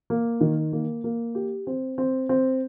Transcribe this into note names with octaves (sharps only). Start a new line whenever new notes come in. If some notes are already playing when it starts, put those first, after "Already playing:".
A#3
D#3
A#3
A#3
G4
C4
C4
C4